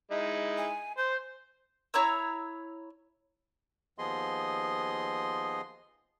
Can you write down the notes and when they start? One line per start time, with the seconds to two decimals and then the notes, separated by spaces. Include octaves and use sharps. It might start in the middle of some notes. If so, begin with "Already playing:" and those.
0.11 G#3 D#4 E4
0.58 G#5
0.98 C5 G6
1.94 E4 C#5 A#5 E6
3.98 D#2 F3 B3 G#4 D#5 C6